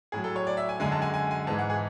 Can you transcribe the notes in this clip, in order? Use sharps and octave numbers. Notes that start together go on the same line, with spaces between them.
A2 F#3 G#4
A4
C#5
D5
E5
G#5
F#2 D3 G#3 G#5
A5
G#5
G#5
G#5
G#2 E3 G#3 A5
F#5
G#4